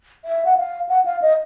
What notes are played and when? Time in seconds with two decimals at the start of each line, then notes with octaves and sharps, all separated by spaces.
0.25 E5
0.45 F#5
0.57 F5
0.89 F#5
1.05 F5
1.22 D#5